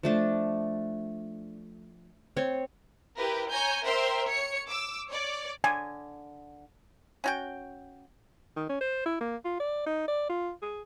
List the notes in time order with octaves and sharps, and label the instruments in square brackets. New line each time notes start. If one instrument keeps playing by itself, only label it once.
[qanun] F3 A3 D4
C4 C#5
[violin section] E4 G4 A#4 B4
C#5 G#5 A#5 G6
A#4 C5 E5 G5 C6
C#5 C#7
D6 E6
C#5 D5
[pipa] D3 [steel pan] G#5
[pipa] C#4 F#4 G5
[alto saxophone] D#3
C#4
C5
E4
A#3
F4
D5
D#4
D5
F4
G#4